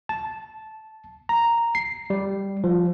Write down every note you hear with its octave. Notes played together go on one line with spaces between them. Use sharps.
A5
A#5
C7
G3
F3